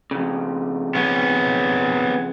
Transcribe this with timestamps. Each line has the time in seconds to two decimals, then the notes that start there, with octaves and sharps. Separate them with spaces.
0.11 F2 C#3
0.95 B3 C#4